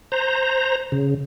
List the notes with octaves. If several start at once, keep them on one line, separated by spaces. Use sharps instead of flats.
C5 A#5
C#3